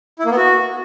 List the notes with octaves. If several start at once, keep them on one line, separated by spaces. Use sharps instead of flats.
E4
A#3
B3
F#4